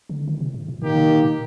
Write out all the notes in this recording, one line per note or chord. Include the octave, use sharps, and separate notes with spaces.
D3
D#3
C3
A2
A#2
A#2 D#3 A#3 D#4 G4
C3
A#2
A#2